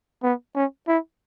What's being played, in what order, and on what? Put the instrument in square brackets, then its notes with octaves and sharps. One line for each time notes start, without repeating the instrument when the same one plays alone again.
[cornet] B3
C#4
E4